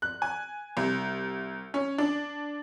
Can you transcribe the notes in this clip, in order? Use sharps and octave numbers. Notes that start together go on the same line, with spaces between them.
F#6
G#5
C2
C#4
D4